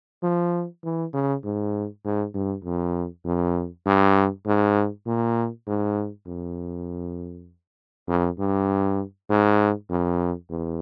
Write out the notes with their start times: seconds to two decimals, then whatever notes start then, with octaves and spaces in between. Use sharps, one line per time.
0.23 F3
0.84 E3
1.13 C#3
1.44 G#2
2.04 G#2
2.34 G2
2.64 F2
3.25 F2
3.86 G2
4.45 G#2
5.06 A#2
5.67 G#2
6.26 F2
8.08 F2
8.38 G2
9.29 G#2
9.90 F2
10.50 E2